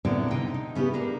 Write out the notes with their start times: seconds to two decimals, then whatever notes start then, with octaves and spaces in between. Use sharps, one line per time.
0.05 A#2 D3 B3 C4 E4 D5
0.31 C3 D#4 G5
0.54 D#4
0.75 C#3 B3 E4 G4
0.93 A#3 D4 A#4